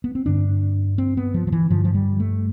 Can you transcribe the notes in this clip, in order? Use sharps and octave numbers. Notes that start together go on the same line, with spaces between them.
B3
C4
G2 D3 D4
C4
B3
F3
F3
E3
G2 D3 F3
F3
G3
A3